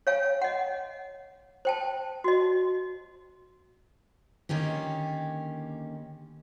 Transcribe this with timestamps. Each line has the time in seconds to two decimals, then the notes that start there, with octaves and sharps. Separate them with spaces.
0.07 C#5 F5 G#5
0.42 D#5 F#5
1.65 C5 G5 A5
2.24 F#4 D#5
4.49 D3 D#3 A#3 C#4 G4